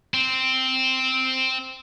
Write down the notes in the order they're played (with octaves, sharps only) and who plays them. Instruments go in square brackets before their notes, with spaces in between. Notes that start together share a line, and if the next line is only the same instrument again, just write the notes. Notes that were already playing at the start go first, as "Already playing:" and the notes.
[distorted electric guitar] C4